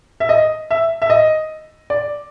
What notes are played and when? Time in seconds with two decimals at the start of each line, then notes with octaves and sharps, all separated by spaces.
0.20 E5
0.29 D#5
0.71 E5
1.02 E5
1.10 D#5
1.90 D5